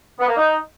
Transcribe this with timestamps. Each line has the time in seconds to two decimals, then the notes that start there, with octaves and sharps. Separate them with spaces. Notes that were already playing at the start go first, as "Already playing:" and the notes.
0.20 B3
0.28 A#3
0.37 D#4